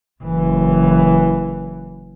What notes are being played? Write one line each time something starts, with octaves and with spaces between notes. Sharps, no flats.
F#1 E3